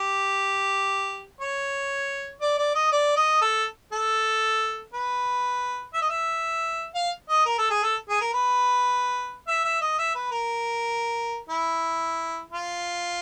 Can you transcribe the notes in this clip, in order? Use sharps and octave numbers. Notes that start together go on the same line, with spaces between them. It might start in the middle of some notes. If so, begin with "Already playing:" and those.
Already playing: G4
C#5
D5
D5
D#5
D5
D#5
A4
A4
B4
E5
D#5
E5
F5
D#5
A#4
A4
G#4
A4
G#4
A#4
B4
E5
E5
D#5
E5
B4
A#4
E4
F4